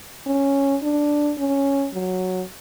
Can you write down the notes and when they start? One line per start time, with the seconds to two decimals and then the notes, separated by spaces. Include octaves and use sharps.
0.27 C#4
0.83 D4
1.38 C#4
1.93 F#3